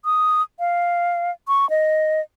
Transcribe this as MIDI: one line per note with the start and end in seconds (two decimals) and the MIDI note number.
0.05 0.42 87
0.59 1.31 77
1.48 1.69 85
1.70 2.21 75